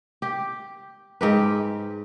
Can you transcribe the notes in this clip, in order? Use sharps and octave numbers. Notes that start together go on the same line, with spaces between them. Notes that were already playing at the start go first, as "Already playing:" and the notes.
G4
G#2 G4 B4